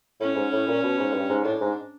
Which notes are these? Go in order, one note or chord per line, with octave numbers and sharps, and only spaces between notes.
A2 C#4
G#2
A2
A#2
B2
G#2
G2
G#2
A2 D4
G#2